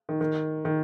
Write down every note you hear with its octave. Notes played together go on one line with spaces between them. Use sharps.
D#3
D#3
D#3